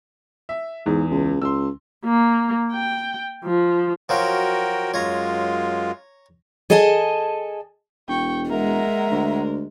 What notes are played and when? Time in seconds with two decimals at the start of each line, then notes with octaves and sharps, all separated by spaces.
0.49 E5
0.86 E2 G#2
1.11 C#2
1.42 C#2 C6 E6
2.04 A#3
2.72 G5
3.44 F3
4.09 F3 F#3 F#4 A#4 F5 G5
4.94 F#2 G#3 F4 C#5 A#5
6.70 G#4 A4 D#5 G#5 A5
8.08 E1 G5 C#6
8.50 G#3 A#4 E5 F#5 A#5
9.11 D2